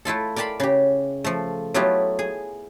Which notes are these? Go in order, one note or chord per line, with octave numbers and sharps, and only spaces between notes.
A3 E4 F4 A4
A#4 D5 G5 A5 B5 C6
C#3 G4
F3 A3
F#3 A3 B3 E4 F4 G4
G#4